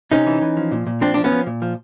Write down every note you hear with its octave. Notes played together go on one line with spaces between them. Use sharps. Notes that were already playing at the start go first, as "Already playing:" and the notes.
C3 C#4 D#4
E3
E3
F3
A#2
A#2
F3 C4 D4
F3 D4
B3 C#4
F3
A#2
F3